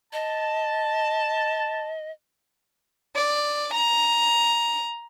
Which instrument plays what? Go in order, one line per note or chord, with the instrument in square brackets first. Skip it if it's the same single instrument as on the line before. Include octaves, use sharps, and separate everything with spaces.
[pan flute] D#5 [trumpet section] A5
[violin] D5
A#5